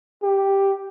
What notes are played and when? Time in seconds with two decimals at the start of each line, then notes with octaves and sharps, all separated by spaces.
0.23 G4